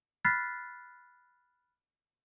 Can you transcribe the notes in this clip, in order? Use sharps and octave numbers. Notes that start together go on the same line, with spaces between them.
B5 F6 F#6 A6 B6 C7